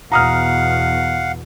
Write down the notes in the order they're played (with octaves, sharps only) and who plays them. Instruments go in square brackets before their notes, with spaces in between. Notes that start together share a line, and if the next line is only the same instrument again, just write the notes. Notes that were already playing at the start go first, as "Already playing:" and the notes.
[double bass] E2 B2 [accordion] F5 F#5 [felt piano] A#5 D#6 F6